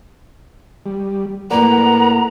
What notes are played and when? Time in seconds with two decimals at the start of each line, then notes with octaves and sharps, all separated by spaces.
0.86 G3
1.51 A2 A#3 A#4 B4 D5 F#5 A#5